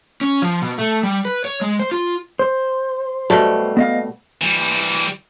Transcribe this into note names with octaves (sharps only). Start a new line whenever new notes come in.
C#4
F3
B2
A3
G3
B4
C#5
G#3
C5
F4
C5
B2 G3 A3
B3 D#5 F5
E3 G3